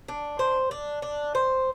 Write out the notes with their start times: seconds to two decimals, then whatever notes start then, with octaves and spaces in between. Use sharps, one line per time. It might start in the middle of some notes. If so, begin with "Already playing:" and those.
0.08 D4
0.39 C5
0.71 D4
1.02 D4
1.35 C5